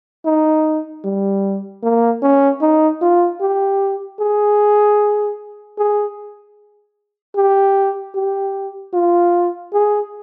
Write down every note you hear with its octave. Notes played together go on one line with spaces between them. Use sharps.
D#4
G3
A#3
C#4
D#4
F4
G4
G#4
G#4
G4
G4
F4
G#4